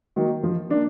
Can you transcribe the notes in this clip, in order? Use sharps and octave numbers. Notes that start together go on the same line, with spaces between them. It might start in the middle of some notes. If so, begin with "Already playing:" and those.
D#3 F#3 A#3
F3
A#3 D4